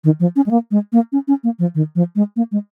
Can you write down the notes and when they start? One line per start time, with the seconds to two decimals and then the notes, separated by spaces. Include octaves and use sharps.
0.04 D#3
0.20 F3
0.36 C#4
0.46 G#3
0.51 A#3
0.71 G#3
0.93 A#3
1.12 C#4
1.28 C#4
1.44 A#3
1.59 F3
1.75 D#3
1.95 F3
2.16 G#3
2.36 A#3
2.52 G#3